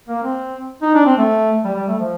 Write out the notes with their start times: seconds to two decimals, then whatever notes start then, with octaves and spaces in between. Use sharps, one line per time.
0.08 A#3
0.23 C4
0.82 D#4
0.94 D4
1.06 C4
1.18 A3
1.65 G3
1.76 G3
1.88 A3
1.99 F3